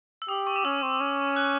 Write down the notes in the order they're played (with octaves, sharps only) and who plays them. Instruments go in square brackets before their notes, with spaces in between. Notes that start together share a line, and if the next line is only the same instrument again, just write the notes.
[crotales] E6
[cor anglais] G4 [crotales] D#6
[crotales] C#6
D6
[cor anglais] C#4 [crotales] E6
[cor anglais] C4
C#4
[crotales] F#6